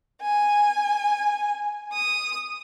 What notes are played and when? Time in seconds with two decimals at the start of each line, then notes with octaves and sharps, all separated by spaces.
0.22 G#5
1.93 D#6